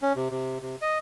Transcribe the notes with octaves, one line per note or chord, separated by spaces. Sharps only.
C#4
C3
C3
C3
D#5